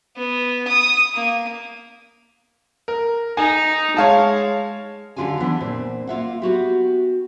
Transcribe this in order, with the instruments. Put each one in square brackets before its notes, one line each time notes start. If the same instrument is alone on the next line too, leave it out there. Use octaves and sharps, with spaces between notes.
[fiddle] B3
D#6
A#3
[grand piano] A#4
[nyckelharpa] D#4 [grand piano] G#5
[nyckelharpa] G#3 [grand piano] C#5 F5 A5
[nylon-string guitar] D2 G2 D3 F4 G4 G#5
E3 B3 D4
A#2 C4
A#3 F4 E5 F#5
B3 F#4 G4